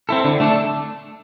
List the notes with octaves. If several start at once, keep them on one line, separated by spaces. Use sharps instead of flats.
C4 E4 A4
D3
A3 D4 A4